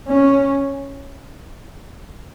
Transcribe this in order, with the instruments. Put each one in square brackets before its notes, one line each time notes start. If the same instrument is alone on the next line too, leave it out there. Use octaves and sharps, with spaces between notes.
[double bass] C#4